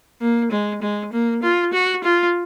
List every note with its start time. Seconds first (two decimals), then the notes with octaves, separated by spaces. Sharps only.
0.21 A#3
0.52 G#3
0.82 G#3
1.13 A#3
1.42 F4
1.73 F#4
2.04 F4